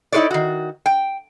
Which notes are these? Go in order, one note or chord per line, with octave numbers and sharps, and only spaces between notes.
D#4 E4 G#4 B4 C#5 D5
D#3 F#4
G5